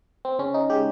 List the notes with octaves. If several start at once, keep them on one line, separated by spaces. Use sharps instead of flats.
C4
C#3 C#4
D#4
G#3 G4